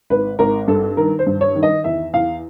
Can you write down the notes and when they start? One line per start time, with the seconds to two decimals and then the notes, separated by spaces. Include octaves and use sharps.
0.10 G#1 B4
0.39 G#1 A#4
0.68 G2 A4
0.97 D#3 A#4
1.19 C5
1.27 G2
1.41 C#5
1.55 D#3
1.63 D#5
1.84 E2 E5
2.13 E2 F5